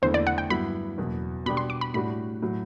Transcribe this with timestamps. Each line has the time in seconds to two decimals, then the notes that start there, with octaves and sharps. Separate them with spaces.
0.02 F#1 E2 D3 A3 E4 C5
0.14 D5
0.27 F#5
0.38 G5
0.50 G2 F#3 B3 E4 B5
0.98 F#1 E2 B2 F#3
1.46 B2 G3 D4 G4 B5
1.57 C6
1.70 D6
1.81 B5
1.94 A2 G3 D4 F#4 B5
2.42 A2 F#3